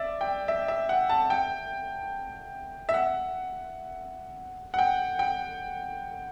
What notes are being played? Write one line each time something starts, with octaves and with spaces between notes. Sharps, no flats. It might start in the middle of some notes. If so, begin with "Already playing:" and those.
Already playing: D5 E5
G5
E5
E5
F#5
A5
G5
E5
F#5
F#5
G5
G5